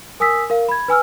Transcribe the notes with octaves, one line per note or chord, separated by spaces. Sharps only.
A#4 G#5 D#6 E6 B6
A#4 F5
B5 G#6
B4 G#5 E6 F6